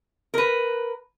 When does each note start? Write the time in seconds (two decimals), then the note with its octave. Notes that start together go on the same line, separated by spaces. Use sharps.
0.34 A#4 B4